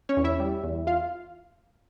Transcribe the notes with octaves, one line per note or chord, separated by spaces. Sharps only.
C#4 C#5
E2
E4 E5
G3
E2
F4 F5